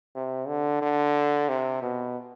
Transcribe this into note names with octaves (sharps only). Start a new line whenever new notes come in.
C3
D3
D3
C3
B2